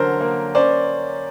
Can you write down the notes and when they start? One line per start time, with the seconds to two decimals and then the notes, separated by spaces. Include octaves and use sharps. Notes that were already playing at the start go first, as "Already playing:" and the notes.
Already playing: D3 F#3 C#4 A#4 C5
0.21 A#3
0.55 C#4 C5 D5